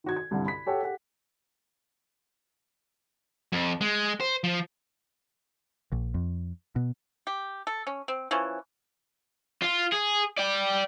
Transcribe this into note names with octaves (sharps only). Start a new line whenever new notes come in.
D#3 F#4 G#6
G#6
C2 G2 D3
B5 B6
G4 A4 C#5 F#5 G5
G4 G#4 F#5
F2
G#3
C5
F3
A#1
F2
B2
G4
A4
C#4
C4
E3 F3 C#4
F4
G#4
D5 G5